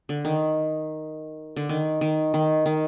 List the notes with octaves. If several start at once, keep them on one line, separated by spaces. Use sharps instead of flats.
D3
D#3
D3
D#3
D#3
D#3
D#3